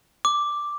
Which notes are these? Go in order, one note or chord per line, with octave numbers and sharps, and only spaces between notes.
D6